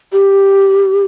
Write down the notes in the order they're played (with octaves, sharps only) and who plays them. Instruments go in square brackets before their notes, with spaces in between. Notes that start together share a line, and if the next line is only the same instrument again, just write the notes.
[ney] G4